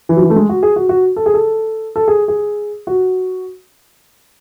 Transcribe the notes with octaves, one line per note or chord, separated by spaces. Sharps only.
E3
F#3
E3
A3
G#3
F#4
G#4
F#4
F#4
A4
G#4
A4
A4
G#4
G#4
F#4